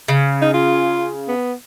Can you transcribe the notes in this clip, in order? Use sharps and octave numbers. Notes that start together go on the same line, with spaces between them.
C#3
D#4
F4
B3